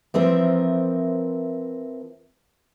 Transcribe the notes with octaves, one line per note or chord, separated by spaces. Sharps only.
E3 F3 C4 A#4 E5